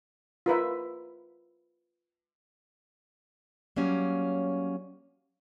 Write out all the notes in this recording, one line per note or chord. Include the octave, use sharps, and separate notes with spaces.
F4 A#4 B4 E5
F#3 G3 A#3 C#4